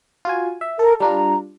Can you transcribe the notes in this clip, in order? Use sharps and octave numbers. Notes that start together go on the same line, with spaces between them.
F4 F#4 G#5
E5
A4 A#4
G3 D4 F4 A#5